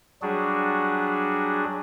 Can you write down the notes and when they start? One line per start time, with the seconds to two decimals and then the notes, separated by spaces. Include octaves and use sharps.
0.22 F#3 G3 D4 F#4 G#4